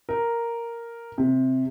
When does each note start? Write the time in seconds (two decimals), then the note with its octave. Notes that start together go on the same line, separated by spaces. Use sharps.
0.09 A#4
1.18 C3